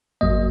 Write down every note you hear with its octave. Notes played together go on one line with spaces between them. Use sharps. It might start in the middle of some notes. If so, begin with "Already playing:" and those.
G#1 F#2 F#3 A#3 D#5